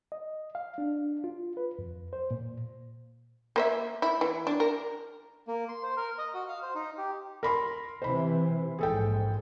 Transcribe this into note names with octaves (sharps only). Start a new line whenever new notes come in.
D#5
F5
D4
F4
B4
F2
C5
A#2
A#3 C5 E5
E4
E3
D4
A#4
A#3
C6
C5
A#4
D#5
F#4
F5
C5
D#4
G4
A#4 B5 C6
C3 E3 C5 B5
A#1 G#2 G#4 A4 G5